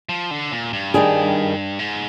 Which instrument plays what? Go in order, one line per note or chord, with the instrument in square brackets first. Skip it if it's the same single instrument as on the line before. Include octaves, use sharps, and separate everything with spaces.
[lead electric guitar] F3
D3
A#2
G2
[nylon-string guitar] D#3 G3 D4 G#4
[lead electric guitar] G#2